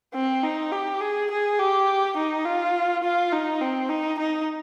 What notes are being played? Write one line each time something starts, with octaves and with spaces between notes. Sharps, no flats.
C4
D#4
G4
G#4
G#4
G4
D#4
F4
F4
D#4
C4
D#4
D#4